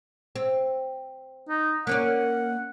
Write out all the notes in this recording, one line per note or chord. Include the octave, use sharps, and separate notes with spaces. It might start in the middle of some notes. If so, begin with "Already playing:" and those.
C4
D#4
A#3 C#4 D5 F#5